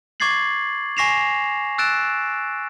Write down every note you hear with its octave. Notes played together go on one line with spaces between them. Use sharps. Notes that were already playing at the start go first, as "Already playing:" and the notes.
C#6 D6 G#6 A6 C7 F#7
G#5 C#6 A#6 C7 E7 F7
E6 F#6 A6 D7 E7